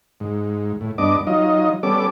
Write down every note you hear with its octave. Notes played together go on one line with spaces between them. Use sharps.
G#2
A2
G2 B3 D4 D#5 D6
F#3 D#4 F4 D#5
G3 B3 C#4 A4 D6